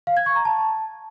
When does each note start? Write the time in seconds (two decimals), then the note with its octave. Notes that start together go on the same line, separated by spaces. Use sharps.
0.07 F5
0.17 G#6
0.26 C#6
0.36 A#5
0.45 A5